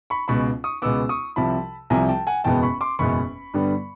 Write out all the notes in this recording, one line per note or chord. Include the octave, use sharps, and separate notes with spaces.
B5 C#6
C#2 B2 G#3 B3 B5 C#6
C#6 D#6
C#2 B2 G#3 B3 D6 E6
C#6 D#6
C2 C3 F3 A5 B5
C2 C3 F3 G#5 A#5
G5 A5
F#5 G#5
F#1 E2 B2 G#3 B3 G5 A5
B5 C#6
C6 D6
F#1 E2 B2 G#3 B3 B5 C#6
G2 D3 G3 B3